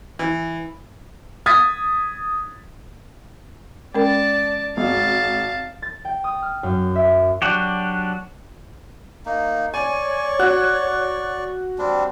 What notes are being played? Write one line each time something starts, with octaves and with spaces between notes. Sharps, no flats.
E3
D#6 G#6 A6 B6
G#3 C#4 A#4 D5 A5
G#1 F5 A5
A6
G5
D#6
F6
F#2
E5
F#3 D4 F#4 G4
A#3 D#4
C#5 D5 G#5 C#6
F#4 F#6
G3 C4 D4